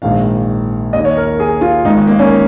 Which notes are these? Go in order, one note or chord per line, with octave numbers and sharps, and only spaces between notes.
A#1 G#2 D#3 F5
D#2 D#3 D#5
C#5
A#4
G#4
F4
G#1 G#2 D#3 D#4
A#3
C#4